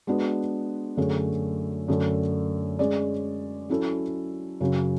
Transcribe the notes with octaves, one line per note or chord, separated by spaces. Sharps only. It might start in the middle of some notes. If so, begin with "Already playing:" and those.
G#3 B3 D4 F#4 B4
F#2 D3 A3 C#4 G#4
F#2 D3 A3 D4 A4
G#3 C#4 G#4 D5
F#3 C#4 E4 A4
F#2 C#3 F#3 C#4